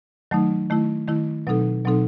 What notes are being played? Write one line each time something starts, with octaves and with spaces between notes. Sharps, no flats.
D#3 F#3 A3 D#4
D#3 A3 E4
D#3 A3 E4
B2 F#3 C4 D#4 A4
B2 F#3 C4 D#4 A4